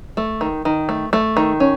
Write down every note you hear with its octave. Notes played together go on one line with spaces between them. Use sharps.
A3
D#3
D#3
A3
A3
D#3
C#4